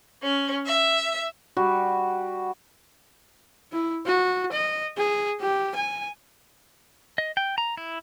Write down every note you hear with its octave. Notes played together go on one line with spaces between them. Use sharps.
C#4
E5
G3 F#4
E4
F#4
D#5
G#4
G4
G#5
D#5
G5
A#5
E4